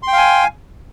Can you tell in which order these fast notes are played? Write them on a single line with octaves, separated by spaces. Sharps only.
C6 G5 F5 G#5